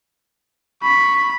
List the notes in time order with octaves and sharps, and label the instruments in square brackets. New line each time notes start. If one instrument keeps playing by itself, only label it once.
[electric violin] B5 [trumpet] C#6